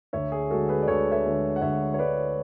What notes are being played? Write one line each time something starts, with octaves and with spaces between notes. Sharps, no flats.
D2 C#5 E5
G#4
D3 G#3 F#4 A4
G#4 B4
D5
D2 A4 C#5
C#5 E5
D3 G#3
F#5
D2 C#5 E5
C#5
D3 G#3 B4 D5